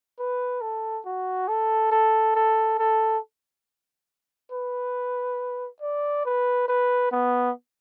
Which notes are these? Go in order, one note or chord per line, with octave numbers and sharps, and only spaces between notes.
B4
A4
F#4
A4
A4
A4
A4
B4
D5
B4
B4
B3